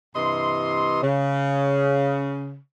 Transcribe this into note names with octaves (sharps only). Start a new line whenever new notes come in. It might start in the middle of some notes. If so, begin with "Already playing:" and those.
G2 C3 E3 D#5 C6
C#3